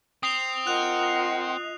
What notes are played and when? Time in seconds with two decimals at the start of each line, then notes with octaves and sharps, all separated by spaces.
0.23 C4 D#6 C7 F7
0.67 F4 A#4 D#5 F#5 C6 F#6 F7